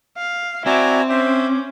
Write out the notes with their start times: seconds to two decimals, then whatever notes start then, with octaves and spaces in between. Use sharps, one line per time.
0.17 F5
0.66 C4 E4 F#4 D5 G#5 A#5
1.09 C#4 C5 E5 D6